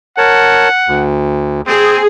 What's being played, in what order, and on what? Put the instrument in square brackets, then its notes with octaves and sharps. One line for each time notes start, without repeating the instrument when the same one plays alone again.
[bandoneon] A#4 C#5 A5 [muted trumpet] F#5
[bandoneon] D2
[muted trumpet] C4 [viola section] G#4